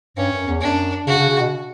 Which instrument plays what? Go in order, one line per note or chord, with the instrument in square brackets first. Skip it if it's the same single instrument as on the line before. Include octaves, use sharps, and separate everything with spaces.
[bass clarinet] G2 [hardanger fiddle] C#4
[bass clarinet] F#2
E2
[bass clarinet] F#2 [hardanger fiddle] D4
[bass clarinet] C#3 [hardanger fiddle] F#4
[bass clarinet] C#3
C#3
B2